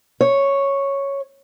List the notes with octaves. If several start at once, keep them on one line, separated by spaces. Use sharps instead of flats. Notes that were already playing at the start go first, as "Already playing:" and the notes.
C#5